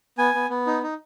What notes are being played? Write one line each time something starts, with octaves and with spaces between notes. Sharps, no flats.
B3 G#5
B3
B3
D#4
D#4